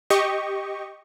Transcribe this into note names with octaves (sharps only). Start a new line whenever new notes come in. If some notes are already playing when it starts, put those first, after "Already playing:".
G4 D#5 C#6